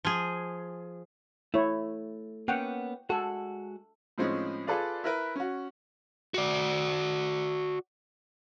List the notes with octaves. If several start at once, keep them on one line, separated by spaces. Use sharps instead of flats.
F3 G#4
A3 E4 C#5
A#3 B3 C#4 F#5 G5
G#3 F#4 A4
A2 F3 G#3 C4 C#4 D#4
F4 G#4 A4 B4 D5 F5
E4 A#4 B4
C#4 F#4
F#4 D5